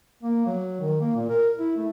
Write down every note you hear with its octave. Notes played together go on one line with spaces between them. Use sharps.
A#3
F#3
D#3
A#3
A#2
A#4
E4
A3